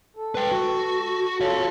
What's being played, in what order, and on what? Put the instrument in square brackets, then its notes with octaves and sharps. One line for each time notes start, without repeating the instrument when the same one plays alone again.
[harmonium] A4
[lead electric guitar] B4 G5
F#4
[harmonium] F4 A4 [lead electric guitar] C#5 F5